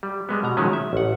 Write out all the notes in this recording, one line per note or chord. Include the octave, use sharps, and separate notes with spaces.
G3
G3 G#3 B3
B2 A#5
D#3 F3 F#3 G#3 A3 C#4
E5
A1 F#5